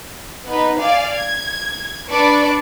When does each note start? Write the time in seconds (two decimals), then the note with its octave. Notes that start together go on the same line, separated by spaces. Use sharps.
0.46 B3 D#4 B4
0.80 D5 F5 G#5
1.14 G#6
2.10 D4 B4 D5 C#6 D6